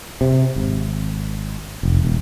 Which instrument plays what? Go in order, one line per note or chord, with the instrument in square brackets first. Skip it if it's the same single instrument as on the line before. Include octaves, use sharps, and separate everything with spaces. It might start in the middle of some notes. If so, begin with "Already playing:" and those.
[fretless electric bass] C3
G#1
F1
E1